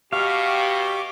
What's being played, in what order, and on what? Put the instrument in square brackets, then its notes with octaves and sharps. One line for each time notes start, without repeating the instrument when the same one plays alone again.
[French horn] B2 [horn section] G4 [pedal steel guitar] F5 [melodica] C#6 D6